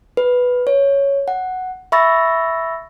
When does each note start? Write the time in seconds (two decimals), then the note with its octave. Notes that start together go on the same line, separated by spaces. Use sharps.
0.17 B4
0.67 C#5
1.28 F#5
1.92 E5 B5 C#6 E6 A6 A#6